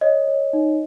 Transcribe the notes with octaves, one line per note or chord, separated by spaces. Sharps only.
C#5 D#5
C#5
D#4